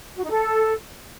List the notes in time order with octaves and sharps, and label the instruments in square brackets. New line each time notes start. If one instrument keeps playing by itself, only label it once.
[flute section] F#4
D#4
A4